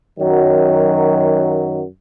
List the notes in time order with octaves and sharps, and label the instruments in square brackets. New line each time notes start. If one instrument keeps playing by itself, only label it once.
[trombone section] F#2 D#3 F#3